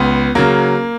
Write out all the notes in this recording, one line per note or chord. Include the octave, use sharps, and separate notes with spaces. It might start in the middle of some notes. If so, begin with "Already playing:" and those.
Already playing: C#2 B3
C#3 F#3 A#3